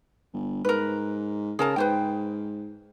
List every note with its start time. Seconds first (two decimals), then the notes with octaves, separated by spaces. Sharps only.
0.33 G1
0.65 G#2 A#4 B4
1.59 C#3 G#4 A#4 A5
1.76 G#2 B4 C5 G5